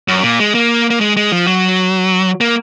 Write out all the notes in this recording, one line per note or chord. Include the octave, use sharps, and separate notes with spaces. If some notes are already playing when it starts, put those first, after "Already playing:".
F#2
A#2
G#3
A#3
A#3
G#3
G#3
F3
F#3
A#3